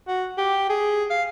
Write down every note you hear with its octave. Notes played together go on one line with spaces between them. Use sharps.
F#4
G4
G#4
F5